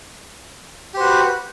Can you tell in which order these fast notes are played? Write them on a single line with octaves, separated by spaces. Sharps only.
G4 C5 F#4 B4